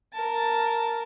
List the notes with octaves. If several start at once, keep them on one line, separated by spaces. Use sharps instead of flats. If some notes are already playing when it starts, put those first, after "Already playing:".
A#4 A5